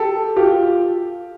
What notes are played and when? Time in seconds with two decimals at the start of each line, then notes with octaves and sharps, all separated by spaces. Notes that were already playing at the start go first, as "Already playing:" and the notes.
Already playing: G4 A4
0.36 F4 G4